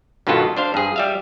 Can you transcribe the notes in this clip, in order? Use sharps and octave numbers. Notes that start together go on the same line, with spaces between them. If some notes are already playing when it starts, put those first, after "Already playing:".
G2 B2 D#3 B3 F4 A4
D4 C5 F5
G2 G#4
G3 E5 F5